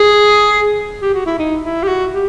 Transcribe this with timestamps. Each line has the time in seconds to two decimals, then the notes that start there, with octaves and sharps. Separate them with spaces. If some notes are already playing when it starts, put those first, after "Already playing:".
Already playing: G#4
1.02 G4
1.14 F#4
1.26 E4
1.39 D#4
1.64 E4
1.83 G4
1.88 F#4
2.12 G4